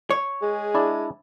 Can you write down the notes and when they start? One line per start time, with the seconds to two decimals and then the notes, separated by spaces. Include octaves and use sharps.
0.10 C#5
0.42 G#3 G#4
0.74 D4 E4 D5